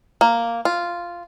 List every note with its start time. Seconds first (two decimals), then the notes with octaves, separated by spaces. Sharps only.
0.21 A#3
0.65 F4